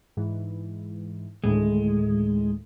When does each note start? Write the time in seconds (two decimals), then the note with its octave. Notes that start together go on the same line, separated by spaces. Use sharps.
0.17 G#2 E3
1.44 D2 A2 D#3 G#3